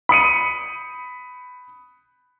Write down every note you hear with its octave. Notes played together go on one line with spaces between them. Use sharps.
B5 D#6 C#7 D#7